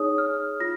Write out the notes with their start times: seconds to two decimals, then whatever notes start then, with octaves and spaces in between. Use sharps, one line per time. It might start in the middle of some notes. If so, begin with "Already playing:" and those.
Already playing: D#4 G#4 C#5 D#6
0.18 F6
0.60 F4 A#6